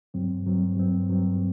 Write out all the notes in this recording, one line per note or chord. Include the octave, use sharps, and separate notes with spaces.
G2 F#3 C4
G2 F#3 C4
G2 F#3 C4
G2 F#3 C4